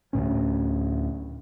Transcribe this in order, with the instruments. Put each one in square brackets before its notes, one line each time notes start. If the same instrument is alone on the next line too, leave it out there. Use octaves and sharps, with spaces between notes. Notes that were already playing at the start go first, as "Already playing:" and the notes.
[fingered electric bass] D2 A2 C#4